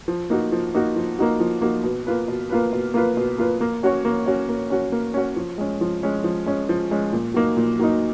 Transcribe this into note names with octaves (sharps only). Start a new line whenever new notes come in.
F3
A#3 D#4 F#4
F3
A#3 D#4 F#4
F3
A#3 D#4 F#4
F3
A#3 D#4 F#4
B2
A#3 F4 B4
B2
A#3 F4 B4
B2
A#3 F4 B4
B2
A#3 F4 B4
A#3
C#4 F#4 C#5
A#3
C#4 F#4 C#5
A#3
C#4 F#4 C#5
A#3
C#4 F#4 C#5
F3
G#3 C#4
F3
G#3 C#4
F3
G#3 C#4
F3
G#3 C#4
A#2
F#3 A#3 D#4
A#2
F#3 A#3 D#4